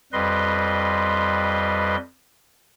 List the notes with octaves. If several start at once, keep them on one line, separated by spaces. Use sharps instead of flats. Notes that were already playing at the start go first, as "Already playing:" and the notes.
F2 G3 B4 D#5 C6